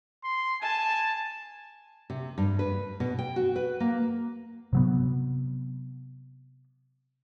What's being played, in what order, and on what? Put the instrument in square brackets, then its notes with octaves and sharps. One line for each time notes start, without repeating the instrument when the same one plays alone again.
[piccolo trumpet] C6
[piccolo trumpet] G#5 [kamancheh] A5
[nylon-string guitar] C3
G2
B4
B2
G5
F#4
B4
A#3
[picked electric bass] C3 F#3 B3